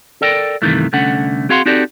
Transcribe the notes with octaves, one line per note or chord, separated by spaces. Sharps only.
A4 A#4 D5 G5
G2 C3 D#3 E3 A3
C2 D3 A3 C#4 F#5
C4 F#4 G#4 F5 F#5 C6
C4 D#4 F#4 G4 A4 D5